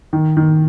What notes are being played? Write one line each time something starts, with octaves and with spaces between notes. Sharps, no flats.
D#3
D#3